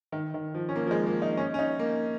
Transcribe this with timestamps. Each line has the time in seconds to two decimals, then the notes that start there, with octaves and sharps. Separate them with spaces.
0.12 D#3
0.34 D#3
0.54 F3
0.69 C#4
0.76 A#3
0.87 F3
0.91 G#3
1.06 A#3
1.22 D#4
1.37 C#4
1.54 C#4
1.59 D#4
1.79 A#3